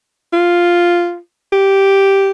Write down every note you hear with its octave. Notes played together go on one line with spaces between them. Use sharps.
F4
G4